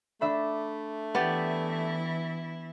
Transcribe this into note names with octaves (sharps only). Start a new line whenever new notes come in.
A3 D4 E5 B5
E3 B3 E4 G4 D5